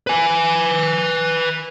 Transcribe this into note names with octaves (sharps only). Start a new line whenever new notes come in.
B4 G#5